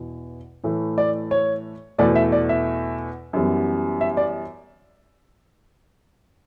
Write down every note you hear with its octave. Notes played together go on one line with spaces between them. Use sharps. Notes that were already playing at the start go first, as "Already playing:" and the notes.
Already playing: E2 B2
A2 E3 A3
D5
C#5
E2 B2 A3 D5
E5
D5
E5
F#2 E3 G3 B3
E5
D5